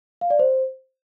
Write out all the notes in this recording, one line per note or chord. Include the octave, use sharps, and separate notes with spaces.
F5
D5
C5